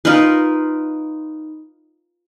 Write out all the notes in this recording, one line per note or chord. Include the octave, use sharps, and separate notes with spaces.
D#4 F4 A#4 B4